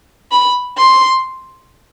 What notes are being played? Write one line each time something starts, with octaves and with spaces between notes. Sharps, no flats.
B5
C6